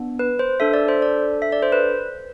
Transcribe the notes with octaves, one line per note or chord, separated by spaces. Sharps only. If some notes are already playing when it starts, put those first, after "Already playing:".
Already playing: B3 D4
B4
C5
D4 A4 E5
D5
C5
D5
E5
D5
C5
B4